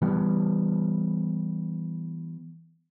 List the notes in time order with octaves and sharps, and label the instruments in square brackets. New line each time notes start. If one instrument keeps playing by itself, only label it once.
[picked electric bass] E3 G3 B3